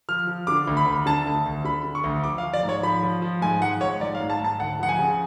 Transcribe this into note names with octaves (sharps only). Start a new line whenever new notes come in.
F3 F6
F3
D3 D6
D2
B5
D2
D3 A5
D2
D2
D3 B5
D3
C#6
D2
F3 D6
F5
F3
D5
G#2
C#5
F3 B5
F3
F3
G#2 G#5
F3 F#5
G#2 C#5
G#2 D5
F5
G#2
A5
G#2 A5
D2 F#5
F3 F#5
G#5
C#3